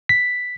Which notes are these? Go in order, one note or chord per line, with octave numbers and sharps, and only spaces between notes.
B6